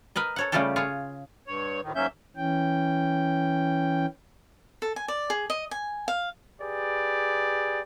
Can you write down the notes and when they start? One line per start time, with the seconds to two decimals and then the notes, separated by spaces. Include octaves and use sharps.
0.16 A#4 B4 D#5
0.36 A4 C#5 F#5
0.52 C#3 G3 A3 F4 G4 A4
0.76 F4 G#4 C#5
1.47 G2 C#5
1.82 D2 A2 D#3
1.95 G#2 F#3 A#3 C#4 E5 G6
2.36 E3 C#4 G5
4.82 A4
4.96 G#5
5.08 D5
5.30 G#4
5.50 D#5
5.71 G#5
6.08 F5
6.61 G4 G#4 B4 D5